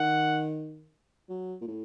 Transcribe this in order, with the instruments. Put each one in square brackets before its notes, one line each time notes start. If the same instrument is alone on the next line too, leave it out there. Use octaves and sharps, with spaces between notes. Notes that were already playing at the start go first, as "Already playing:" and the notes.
Already playing: [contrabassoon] D#3 [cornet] F#5
[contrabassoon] F#3
A#2
A2